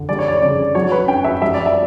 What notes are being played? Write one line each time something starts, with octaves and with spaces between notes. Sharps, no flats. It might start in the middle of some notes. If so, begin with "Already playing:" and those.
Already playing: D3
G3 D5
C#5
D5
C#3 D5
F#3 C#5
B4
C#4 G5
E5
G3 E5
D5
E5